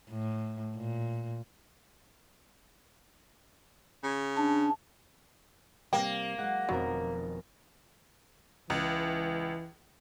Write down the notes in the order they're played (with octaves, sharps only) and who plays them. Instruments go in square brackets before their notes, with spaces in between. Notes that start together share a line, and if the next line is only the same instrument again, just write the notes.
[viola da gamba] A2
A#2
[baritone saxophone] C#3
[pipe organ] D4
[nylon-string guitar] C3 G3 [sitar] A#3 [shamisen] G5
[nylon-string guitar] F#3 G#3 [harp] F#5
[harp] F1 B3 A#4 [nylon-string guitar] B2 D#3 C4 [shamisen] F#3
[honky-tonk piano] C#2 [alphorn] E3